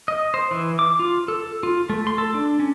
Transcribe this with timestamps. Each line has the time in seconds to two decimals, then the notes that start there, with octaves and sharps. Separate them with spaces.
0.08 D#5
0.34 C5
0.51 E3
0.79 D6
0.99 F4
1.28 A4
1.63 F4
1.90 A3
2.07 C6
2.18 A4
2.34 D4
2.60 C#4